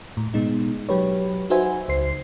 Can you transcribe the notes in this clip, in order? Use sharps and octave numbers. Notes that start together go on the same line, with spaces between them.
A2
B2 G#3 B3 D#4
F#3 G4 B4 C#5
D#4 F#4 B4 C5 E5 G#5
C#2 C5 C7